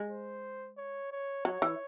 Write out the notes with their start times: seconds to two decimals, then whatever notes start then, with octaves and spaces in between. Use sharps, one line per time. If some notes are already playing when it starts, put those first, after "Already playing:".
Already playing: G#3
0.11 C5
0.78 C#5
1.12 C#5
1.45 F#3 C#5
1.62 E3